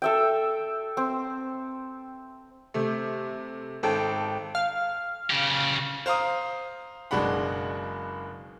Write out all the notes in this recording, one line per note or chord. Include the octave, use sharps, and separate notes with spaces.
A4 E5 G5
C4
C3 A3
G#1 A4 G5
F5
C#3 G4
C5 F5 A#5 D#6
F#1 B2 G#3 D4 F#5 B5